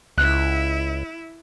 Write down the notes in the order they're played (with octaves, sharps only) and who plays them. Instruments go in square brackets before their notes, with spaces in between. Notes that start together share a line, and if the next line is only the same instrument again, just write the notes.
[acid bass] C#2 [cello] E4 [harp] F#6